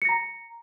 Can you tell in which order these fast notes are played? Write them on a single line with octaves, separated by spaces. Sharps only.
C#7 A#6 A#5